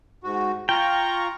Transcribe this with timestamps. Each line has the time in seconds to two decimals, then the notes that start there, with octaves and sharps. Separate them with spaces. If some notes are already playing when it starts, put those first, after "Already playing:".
0.23 G#2 F#4
0.69 F4 G5 A#5 C#6